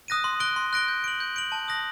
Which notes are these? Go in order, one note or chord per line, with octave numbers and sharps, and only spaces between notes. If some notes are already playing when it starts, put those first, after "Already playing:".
D#6 F#6 A#6 D#7
C6
F#6 A#6 D7 G7
C6
F#6 A#6 D7 G7
G6
D7 F#7
G6
D7 F#7
A5
D#6 F#6 A#6 F#7